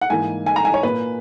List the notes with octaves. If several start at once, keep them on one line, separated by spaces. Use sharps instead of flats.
F#5
G#2 E3 A#3 G#5
G#5
A#5
G#5
C#5
A#2 A#3 B4